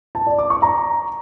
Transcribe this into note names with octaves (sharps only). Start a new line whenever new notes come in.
A5
D5
D6
C#6
A#5